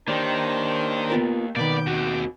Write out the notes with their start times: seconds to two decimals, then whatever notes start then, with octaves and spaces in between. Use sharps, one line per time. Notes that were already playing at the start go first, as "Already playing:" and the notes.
0.08 D#3 A#3 D4 G4 C5 D5
1.10 B3 F4 A#4
1.56 B2 D#3 A#3 B4 D5 D6 G6
1.87 D#2 C4 F#4